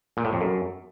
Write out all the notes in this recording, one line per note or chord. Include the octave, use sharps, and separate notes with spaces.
A#2
A2
F2
F#2